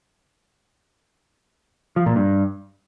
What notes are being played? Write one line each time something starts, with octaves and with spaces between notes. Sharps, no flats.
F3
A#2
G2